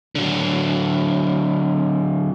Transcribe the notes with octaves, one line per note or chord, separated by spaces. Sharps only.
D3 F#3